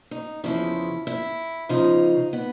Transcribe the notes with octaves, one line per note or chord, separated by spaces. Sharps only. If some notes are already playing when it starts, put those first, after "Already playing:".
D#4
E2 C#3 F3 E4
E4
E2 C#3 F3 D#4
B3